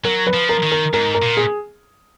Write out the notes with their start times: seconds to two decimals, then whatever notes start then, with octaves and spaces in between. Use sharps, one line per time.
0.05 F#3 A#4
0.27 B4
0.34 F3
0.49 A#4
0.63 D#3
0.72 A#4
0.93 G#2 A#4
1.14 A#4
1.22 A#2
1.37 G#4